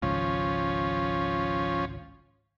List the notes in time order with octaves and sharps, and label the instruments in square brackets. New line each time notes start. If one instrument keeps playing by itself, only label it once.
[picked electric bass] G#1 C#2 [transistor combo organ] F3 C#4